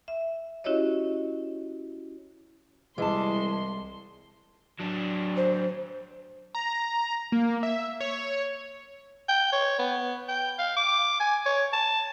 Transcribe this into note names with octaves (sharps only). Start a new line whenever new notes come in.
E5
C#4 E4 F#4 G4 C#5 D#5
C2 E3 G#3 A5 C6
F#3 D4
C5
A#5
A#3
E5
C#5
G5
C#5
B3
G5
F5
D6
G#5
C#5
A5